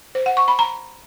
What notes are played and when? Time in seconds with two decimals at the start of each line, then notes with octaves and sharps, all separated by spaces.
0.15 C5
0.26 F#5
0.37 C#6
0.48 B5
0.59 A#5